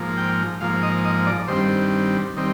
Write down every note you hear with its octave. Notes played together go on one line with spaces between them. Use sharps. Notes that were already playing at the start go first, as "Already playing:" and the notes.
Already playing: G#2 F3 A#3
G5
G#2 F3 A#3 F5
D#5
D#5
D5
G2 D#3 G3 C4 C5
D#3 G3 C4